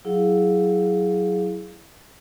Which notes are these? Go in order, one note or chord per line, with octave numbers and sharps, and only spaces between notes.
F#3 E4 G#4 F5